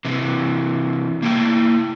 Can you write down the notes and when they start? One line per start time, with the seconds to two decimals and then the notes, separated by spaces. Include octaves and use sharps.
0.05 C3 E3
1.22 A#3 E4 G5